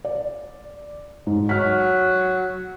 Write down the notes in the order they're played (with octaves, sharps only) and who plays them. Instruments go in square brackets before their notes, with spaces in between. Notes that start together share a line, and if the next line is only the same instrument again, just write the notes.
[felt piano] D5
G#2
[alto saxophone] F#3 [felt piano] F6 B6